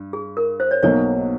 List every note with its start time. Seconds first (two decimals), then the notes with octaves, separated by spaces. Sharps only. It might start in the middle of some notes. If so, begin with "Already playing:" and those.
Already playing: G2
0.13 G#4
0.37 A#4
0.60 C5
0.71 C#5
0.83 B1 B2 F#3 A#3 D#4 C#5